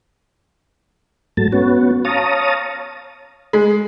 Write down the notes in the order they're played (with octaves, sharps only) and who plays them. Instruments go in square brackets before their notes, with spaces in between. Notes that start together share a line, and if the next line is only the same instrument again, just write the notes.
[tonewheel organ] G#2 F#3 A3 A5
B3 C#4 F#4
C#5 F5 A5 A#5 D#6
[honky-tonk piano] G#3